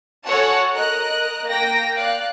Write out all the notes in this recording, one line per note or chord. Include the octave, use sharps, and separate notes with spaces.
F#4 A4 C#5 F#5 G#5 A5
A#4 D#5 F#6
A#3 G5 A#6
D5 F5 F#6